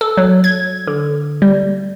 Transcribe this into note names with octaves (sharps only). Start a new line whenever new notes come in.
A4
F#3
G#6
D3
G3